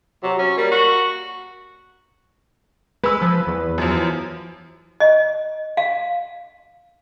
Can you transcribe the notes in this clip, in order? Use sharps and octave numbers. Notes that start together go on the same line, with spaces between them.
C3 F#3
F#3 C#4
G3 A#3
F#4
G#3 B4 E6
F3
E2
F#2 F3
D#5
F5